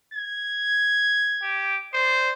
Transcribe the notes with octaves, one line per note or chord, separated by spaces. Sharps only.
G#6
G4
C5 D5